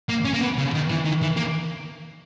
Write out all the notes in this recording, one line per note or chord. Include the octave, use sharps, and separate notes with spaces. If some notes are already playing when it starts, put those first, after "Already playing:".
A#3
C#4
A#3
B3
C#3
D#3
E3
D#3
E3
A#3